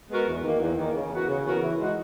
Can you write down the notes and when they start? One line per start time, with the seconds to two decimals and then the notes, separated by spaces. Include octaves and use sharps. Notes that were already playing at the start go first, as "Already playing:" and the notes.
0.10 G#3 B3 F#4 A#4
0.27 E2
0.43 D#3 A#3
0.60 E2
0.77 D#3 A#3
0.94 C#3
1.11 E3 B3 F#4 A#4
1.28 C#3
1.44 E3 B3 F#4 A#4
1.61 E3
1.78 G#3 D#4 F#4